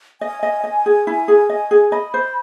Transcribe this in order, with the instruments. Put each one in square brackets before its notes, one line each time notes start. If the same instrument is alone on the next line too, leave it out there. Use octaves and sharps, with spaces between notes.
[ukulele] D#5 [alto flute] G#5
[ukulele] D#5
D#5
G#4
E4
G#4
D#5
G#4
[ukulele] D#5 [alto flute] B5
[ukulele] C5